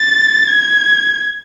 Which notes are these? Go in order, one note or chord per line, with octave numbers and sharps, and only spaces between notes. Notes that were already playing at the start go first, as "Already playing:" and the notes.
Already playing: A6
G#6